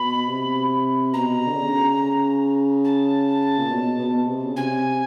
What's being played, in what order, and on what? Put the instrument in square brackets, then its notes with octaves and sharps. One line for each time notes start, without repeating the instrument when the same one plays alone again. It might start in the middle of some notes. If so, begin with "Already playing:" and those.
Already playing: [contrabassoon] B2 [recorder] B5
[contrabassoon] C3
[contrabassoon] B2 [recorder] A#5
[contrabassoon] D3
C#3
[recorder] A5
[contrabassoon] A#2
B2
B2
C3
C#3
[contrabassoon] C3 [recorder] G#5